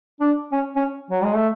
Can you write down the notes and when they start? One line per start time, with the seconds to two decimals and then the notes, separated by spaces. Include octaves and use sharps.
0.21 D4
0.52 C#4
0.76 C#4
1.11 F#3
1.23 G#3
1.36 A3